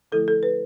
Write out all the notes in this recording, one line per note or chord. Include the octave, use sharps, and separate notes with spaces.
D3 F3 A3 E4 A4
A4
B4